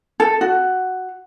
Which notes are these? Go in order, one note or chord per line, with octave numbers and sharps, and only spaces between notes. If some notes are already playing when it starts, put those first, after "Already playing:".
A4
F#4